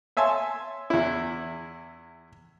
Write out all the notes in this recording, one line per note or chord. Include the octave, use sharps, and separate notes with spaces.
C#5 E5 G#5 A5 C6
E2 E4